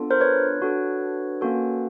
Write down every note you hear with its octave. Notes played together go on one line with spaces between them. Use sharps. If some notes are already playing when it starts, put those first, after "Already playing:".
Already playing: B3 D4 F4 A4
A#4 C5
B4 C#5
D4 F#4 A4
A#3 C#4 F#4 A4